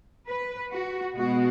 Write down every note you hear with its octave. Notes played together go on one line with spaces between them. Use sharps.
B4
F#4
B2 G#3 B3 F#4